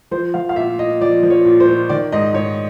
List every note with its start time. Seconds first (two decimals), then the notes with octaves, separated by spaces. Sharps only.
0.11 F3 C5
0.34 F3 F5
0.49 F5
0.56 A#2 E5
0.79 A#2 D#5
1.01 F3 D5
1.23 F3
1.30 C#5
1.45 A#2
1.60 C5
1.68 A#2
1.89 D#3 D5
2.12 G#2 D#5
2.34 G#2 C#5